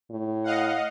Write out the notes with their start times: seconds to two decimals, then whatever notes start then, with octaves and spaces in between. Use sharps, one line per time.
0.11 A2
0.44 D#5 F5 F#5